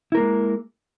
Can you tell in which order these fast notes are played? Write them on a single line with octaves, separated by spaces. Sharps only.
E4 A#4 A#3 G#3